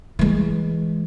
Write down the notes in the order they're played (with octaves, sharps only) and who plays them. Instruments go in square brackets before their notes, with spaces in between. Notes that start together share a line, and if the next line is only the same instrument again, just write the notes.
[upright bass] E3 G#3